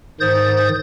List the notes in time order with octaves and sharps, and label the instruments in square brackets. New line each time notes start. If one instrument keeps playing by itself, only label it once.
[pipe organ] G#2 D#3 C5 D#6 G6 A6